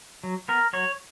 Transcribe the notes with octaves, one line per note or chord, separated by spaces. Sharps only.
F#3
B3 A#4
F#3 C#5